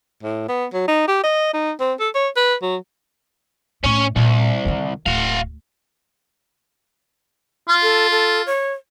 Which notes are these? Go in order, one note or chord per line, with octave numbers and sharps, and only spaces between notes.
A2
B3
F#3
D#4
G4
D#5
D#4
C4
A4
C#5
B4
F#3
A2 A3 C#4 C#5
C2 A#2
D3 D#3
D1 F#4 F5
F4
A4
A4
C#5